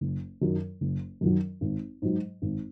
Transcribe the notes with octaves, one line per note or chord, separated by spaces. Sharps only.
F#1
F#2 D#3 F#3
F#1
F#2 D#3 F#3
G#1
G#2 F#3
G#1